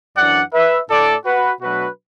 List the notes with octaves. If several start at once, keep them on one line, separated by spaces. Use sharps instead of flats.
F#2 E3 D4 D5 F#5
B4 E5
A2 A3 D4 A4 D5
F#4 B4
B2 F#3 A3 D4 F#4 B4